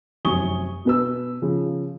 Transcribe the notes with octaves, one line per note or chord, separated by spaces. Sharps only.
F1 F#2 G#5 C#6 D#6 G7
B2 B4 E6
C#3 F3